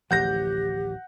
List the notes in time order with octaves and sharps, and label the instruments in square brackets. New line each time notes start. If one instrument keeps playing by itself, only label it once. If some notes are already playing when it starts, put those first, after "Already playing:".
[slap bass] D1 A1 F3 [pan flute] G4 [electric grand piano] F#5 G6 A#6